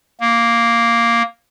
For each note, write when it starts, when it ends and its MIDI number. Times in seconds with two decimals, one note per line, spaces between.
0.20 1.23 58